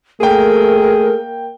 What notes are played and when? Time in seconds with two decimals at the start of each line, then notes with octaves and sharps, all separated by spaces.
0.20 A3 A#3 G#4 A#4 G5